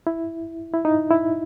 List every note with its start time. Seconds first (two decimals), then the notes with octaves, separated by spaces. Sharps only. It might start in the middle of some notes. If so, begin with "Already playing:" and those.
0.07 E4
0.73 E4
0.85 D#4
1.10 E4